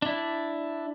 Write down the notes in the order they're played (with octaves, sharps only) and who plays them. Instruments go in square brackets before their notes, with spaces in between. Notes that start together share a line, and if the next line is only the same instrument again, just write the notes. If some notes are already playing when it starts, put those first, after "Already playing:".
[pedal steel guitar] D4 E4